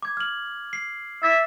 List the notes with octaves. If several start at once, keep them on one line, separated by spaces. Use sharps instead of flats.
D6 G#6
F6 F#7
C7
E5 D6 A6